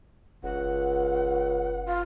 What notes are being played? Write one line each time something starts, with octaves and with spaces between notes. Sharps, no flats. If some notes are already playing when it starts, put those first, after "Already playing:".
F#1 C#2 F#5
F4